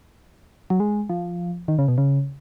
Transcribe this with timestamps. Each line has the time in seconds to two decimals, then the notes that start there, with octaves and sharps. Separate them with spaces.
0.70 F#3
0.80 G#3
1.09 F3
1.68 D#3
1.78 C#3
1.88 B2
1.98 C#3